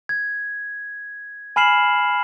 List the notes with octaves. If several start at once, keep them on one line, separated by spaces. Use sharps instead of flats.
G#6
G#5 B5 F6 C7 E7 F#7